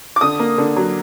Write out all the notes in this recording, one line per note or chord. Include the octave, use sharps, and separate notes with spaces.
D6
D3 D#6
A#3
D3
F#3